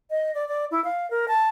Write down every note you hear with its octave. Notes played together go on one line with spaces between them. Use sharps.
D#5
D5
D5
E4
F5
A#4
A5